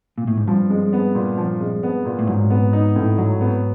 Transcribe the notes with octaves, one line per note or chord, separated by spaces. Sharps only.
A#2
A2
G#2
G2 F3
G#3
B3
A#2
F3
G#3
B3
A#2
A2
G#2 F#3
B3
D#4
A2
F#3
B3